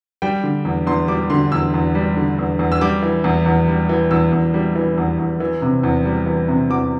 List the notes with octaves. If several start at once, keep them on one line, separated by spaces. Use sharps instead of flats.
G3 G5
D3
E2
E2 C6
G3 D6
D3 C6
E2 E6
E2
G3
D3
E2
E2
E6
G3 D6
E3
E2
E2
G3
E3
E2 E6
E2
G3
E3
E2
E2
E3
C3
E2
G3
E3
C3
E2 D6